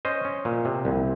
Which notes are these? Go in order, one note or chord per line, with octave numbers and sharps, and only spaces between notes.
C#4 C5 D#5
C#4
A#2
C3
C2